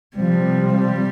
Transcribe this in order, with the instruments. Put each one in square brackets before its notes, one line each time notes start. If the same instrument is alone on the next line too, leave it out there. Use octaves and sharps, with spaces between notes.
[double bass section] C3 F3 C4 [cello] G3
[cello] G3